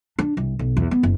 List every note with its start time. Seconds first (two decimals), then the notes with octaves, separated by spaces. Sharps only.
0.19 D4
0.37 C2
0.59 B1
0.77 E2
0.91 B3
1.03 F#1